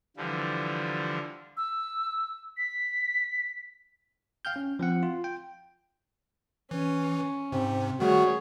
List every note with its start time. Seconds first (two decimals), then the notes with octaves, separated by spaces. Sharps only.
0.17 D3 E3 F3 G3
1.57 E6
2.57 B6
4.45 F5 G5 F6 G6
4.56 C#4
4.79 F3 C4 F#5
5.03 F4
5.24 G5
6.71 E3 C#4
7.52 G#2 C3 C4
8.00 D#3 G3 A3 F#4 G#4 C#5